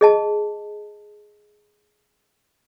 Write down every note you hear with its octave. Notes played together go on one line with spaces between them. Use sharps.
G#4 D#5 A5